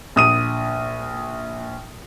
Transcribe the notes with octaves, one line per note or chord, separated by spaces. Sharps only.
A#1 D#6 D#7